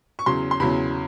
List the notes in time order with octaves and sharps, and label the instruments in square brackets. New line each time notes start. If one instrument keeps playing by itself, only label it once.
[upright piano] C#6
E2 C#3 F#3 C6
C6
E2 C#3 F#3 B5